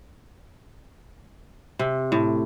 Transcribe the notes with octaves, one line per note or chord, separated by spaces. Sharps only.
C3
A2